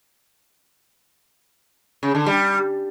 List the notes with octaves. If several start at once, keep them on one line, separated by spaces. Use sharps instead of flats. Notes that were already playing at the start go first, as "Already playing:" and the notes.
C#3
D3
G3